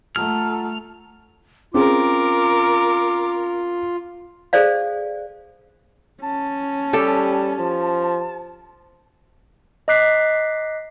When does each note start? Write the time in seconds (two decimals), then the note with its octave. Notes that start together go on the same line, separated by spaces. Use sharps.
0.16 A3 F4 A4 F#5 A#5 F6
1.74 C4 C#4 F4 G#4 A#4 D6
4.53 G#4 A4 C5 D5 F5
6.23 C#4 A5
6.93 G3 G4 A4
7.59 F3
9.88 D#5 A#5 D6 F#6 B6 C7